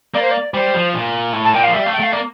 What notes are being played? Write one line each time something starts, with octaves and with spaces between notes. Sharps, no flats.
A#3 D5
C5
D5
G3 C5
F3
A#2
A2
A5
A#2 G5
F3 F5
G3 E5
A3 F5
G5
A3 F5
A#3 D5